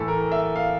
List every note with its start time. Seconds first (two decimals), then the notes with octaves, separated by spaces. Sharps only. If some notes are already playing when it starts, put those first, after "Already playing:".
Already playing: A2 E3 A4
0.08 A#4
0.32 E5
0.56 F5